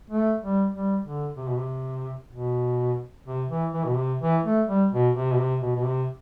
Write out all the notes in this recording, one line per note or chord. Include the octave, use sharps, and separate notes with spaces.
A3
G3
G3
D3
C3
B2
C3
B2
C3
E3
E3
B2
C3
E3
A3
G3
B2
C3
B2
C3
B2
B2
C3